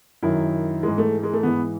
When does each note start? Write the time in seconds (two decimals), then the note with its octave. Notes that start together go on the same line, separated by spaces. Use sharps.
0.23 F#2 D#3 E4
0.83 G#2 E3 G#3
0.98 A3
1.23 G#3
1.33 A3
1.43 G#2 E3 B3